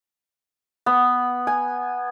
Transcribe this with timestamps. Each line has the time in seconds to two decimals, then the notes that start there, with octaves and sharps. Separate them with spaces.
0.86 B3
1.47 G#5